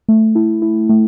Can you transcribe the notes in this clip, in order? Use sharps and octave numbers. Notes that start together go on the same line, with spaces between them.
A3
E4
E4
A3